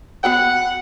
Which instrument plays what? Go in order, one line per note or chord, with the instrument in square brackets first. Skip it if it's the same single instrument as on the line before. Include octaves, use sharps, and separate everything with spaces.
[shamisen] B3 F#4 G5 [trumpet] F#5